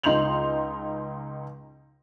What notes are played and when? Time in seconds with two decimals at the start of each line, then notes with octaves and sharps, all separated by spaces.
0.03 C#2 D#4 C6 G6 F7 F#7